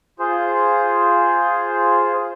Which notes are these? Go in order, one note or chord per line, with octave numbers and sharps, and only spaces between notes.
F4 G#4 C5